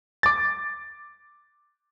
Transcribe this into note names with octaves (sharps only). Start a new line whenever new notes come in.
D6 A6